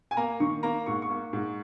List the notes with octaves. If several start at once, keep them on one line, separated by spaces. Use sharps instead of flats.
G#5
A#3 A#5
D#3 C#6
A#3 A#5
G#2 C#6
C#6
A#3
G#2